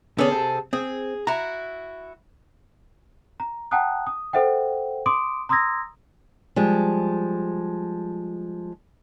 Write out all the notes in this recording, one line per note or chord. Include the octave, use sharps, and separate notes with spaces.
D3 B3 C#4 G#4 A4
C3 C4
C4 G#4
E4 F#4 A#5
A#5
F#5 G5 A5 A#5 D#6 F#6
D#6
A4 C5 E5 F#5 G5
C6 D6 D#6 D7
A#5 C6 D#6 E6 G#6 A#6
F3 G3 G#3